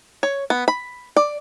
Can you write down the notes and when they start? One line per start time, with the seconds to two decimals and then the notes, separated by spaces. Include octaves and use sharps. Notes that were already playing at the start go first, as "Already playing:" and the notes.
0.23 C#5
0.50 B3
0.68 B5
1.16 D5